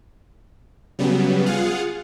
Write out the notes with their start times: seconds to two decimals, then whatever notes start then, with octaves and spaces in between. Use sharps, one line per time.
0.99 C#3 F#3 G3 B3
1.46 F4 G#4 F5 F#5